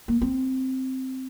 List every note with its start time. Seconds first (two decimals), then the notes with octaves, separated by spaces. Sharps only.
0.08 A#3
0.21 C4